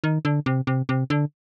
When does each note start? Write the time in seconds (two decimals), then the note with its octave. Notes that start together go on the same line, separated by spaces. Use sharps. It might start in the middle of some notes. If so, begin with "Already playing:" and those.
0.04 D#3
0.25 D3
0.46 C3
0.67 C3
0.89 C3
1.10 D3